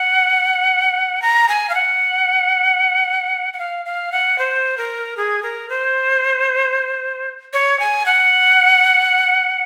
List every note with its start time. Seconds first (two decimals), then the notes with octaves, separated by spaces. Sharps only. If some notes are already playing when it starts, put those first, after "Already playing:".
Already playing: F#5
1.22 A#5
1.49 G#5
1.69 F5
1.75 F#5
3.53 F#5
3.59 F5
3.85 F5
4.12 F#5
4.38 C5
4.78 A#4
5.17 G#4
5.43 A#4
5.69 C5
7.53 C#5
7.80 G#5
8.06 F#5